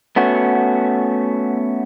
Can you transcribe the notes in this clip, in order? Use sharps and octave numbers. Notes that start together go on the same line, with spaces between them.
A3 B3 C#4 F#4